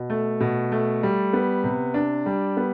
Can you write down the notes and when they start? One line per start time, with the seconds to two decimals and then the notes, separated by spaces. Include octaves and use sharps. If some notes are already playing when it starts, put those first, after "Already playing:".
Already playing: B2
0.10 A3
0.40 B2
0.72 A3
1.03 G3
1.33 B3
1.64 C3
1.94 D4
2.26 G3
2.57 B3